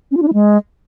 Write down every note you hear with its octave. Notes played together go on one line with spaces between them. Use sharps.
C#4
F4
D4
E4
G#3